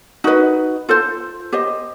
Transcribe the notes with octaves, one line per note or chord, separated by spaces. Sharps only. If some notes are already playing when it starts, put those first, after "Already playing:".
D#4 F#4 B4 D#5
F4 A4 C5
G4 C5 D#5